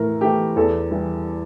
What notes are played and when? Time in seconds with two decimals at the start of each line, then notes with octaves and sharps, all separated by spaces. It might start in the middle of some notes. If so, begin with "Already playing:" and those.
Already playing: A2 E3 A#4
0.21 E3 A3 G4
0.56 E2 A4
0.91 E3 G3